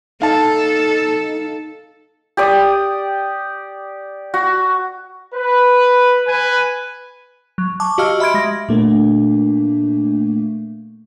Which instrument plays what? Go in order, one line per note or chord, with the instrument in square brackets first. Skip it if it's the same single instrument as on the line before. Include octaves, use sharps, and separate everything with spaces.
[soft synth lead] D#4 [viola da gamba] A4 [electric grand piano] F5 A5
[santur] G4 D5 D#6
F#4
[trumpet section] B4
B4 G#5
[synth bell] F#3
A5 C#6 D6
F#4 G4 D#5 F5 E6 F6
E5 B5 C6 G#6 D7
G#3 A#6
[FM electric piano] A#2 A3 A#3 [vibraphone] D4